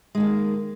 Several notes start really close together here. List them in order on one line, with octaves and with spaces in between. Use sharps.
G#3 D#3 A#3